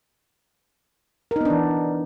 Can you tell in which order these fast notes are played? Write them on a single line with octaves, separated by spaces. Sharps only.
A#4 D#4 B3 D4 E3